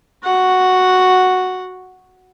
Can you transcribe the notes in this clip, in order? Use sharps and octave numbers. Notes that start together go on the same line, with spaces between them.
F#4 F#5